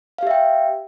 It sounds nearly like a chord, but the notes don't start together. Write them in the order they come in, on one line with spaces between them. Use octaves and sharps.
F5 G4 E5 G5